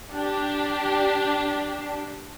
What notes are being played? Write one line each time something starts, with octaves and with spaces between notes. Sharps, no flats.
D4 G4